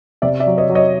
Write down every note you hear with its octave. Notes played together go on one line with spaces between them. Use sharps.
C3 D5 E5
D5 E5
F#3
C#5 D#5
F#3
C#5 D#5